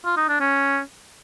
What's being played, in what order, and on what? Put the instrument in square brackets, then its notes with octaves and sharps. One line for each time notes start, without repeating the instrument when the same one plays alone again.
[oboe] F4
D#4
D4
C#4